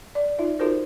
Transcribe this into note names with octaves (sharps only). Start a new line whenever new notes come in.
D5
D#4 F4 E5
D#4 F4 F#4 A4 A#4 C5